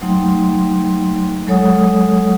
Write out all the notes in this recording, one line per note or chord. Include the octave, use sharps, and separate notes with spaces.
F#3 A3 D#4 G5 C6
F#3 G#3 A4 C#5 F#5 D#6